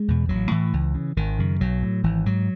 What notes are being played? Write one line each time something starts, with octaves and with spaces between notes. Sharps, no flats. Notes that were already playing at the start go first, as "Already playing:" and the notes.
Already playing: G#3
E2 B2
A1 F#3
A2 E3
C#2
C#3
G#1 D#3
F#2 C#3
B1 F#3
A2
G#1 E3
G#2 F#3